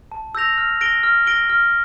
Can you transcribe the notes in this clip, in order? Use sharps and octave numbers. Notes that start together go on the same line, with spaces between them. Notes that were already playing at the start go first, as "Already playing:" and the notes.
A5
E6 G6 A#6 F7
F6
A#6 D7 G7
F6
A#6 D7 G7
F6